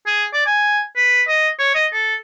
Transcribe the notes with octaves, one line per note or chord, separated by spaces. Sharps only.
G#4
D5
G#5
B4
D#5
C#5
D#5
A4